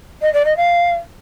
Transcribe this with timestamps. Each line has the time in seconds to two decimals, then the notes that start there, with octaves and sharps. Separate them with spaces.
0.21 D#5
0.33 D5
0.45 D#5
0.56 F5